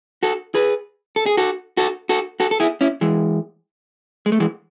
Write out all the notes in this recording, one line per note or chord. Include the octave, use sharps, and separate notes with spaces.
F#4 A4
G#4 B4
A4
G#4
F#4 A4
F#4 A4
F#4 A4
F#4 A4
A4
E4 G#4
C#4 E4
E3 G#3
G#3
A3
E3 G#3